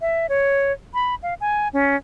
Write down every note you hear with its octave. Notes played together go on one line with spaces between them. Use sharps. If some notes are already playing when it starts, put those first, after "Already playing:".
E5
C#5
B5
F5
G#5
C#4